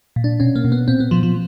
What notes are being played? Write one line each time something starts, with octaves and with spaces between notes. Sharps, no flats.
A#2
D4
B2 C#4
A#3
B2
B3
A#2 C4
B3
A#2 F3
F3